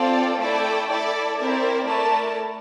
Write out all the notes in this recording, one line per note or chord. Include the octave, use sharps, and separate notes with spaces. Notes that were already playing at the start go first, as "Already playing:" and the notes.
Already playing: C4 F4 A4 D5
A3 E4 A4 D5 G5
E4 A4 D5
C4 E4 A#4 D5
A3 E4 A#4 D5 A5